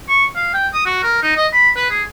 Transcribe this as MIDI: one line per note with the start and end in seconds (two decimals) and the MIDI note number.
0.09 0.25 85
0.36 0.53 77
0.54 0.68 79
0.73 0.82 87
0.85 1.03 66
1.03 1.20 70
1.22 1.35 63
1.37 1.47 75
1.53 1.69 83
1.76 1.86 71
1.90 2.03 68